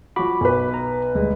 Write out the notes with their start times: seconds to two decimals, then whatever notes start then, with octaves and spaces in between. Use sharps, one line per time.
0.16 F3 F#4 B5 D6
0.41 B1 B4
0.74 A#5
1.15 D2 G3 G#3